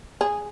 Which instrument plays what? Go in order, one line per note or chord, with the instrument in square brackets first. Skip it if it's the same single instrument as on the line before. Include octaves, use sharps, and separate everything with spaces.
[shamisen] G#4